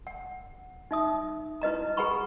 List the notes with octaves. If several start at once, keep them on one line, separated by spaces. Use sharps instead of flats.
F#5
D#4 E5 D#6
E4 B4 D#5 A#5
G#4 B4 F#5 A#5 B5 C#6